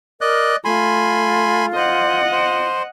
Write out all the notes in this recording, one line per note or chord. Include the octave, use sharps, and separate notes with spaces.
A#4 D5 D#5 F#6
A3 F4 G#5 B5 C6
C5 D#5 F#5
C5